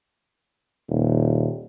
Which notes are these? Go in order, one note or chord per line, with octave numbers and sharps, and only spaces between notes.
D#1